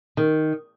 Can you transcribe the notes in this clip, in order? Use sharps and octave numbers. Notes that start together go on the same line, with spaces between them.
D#3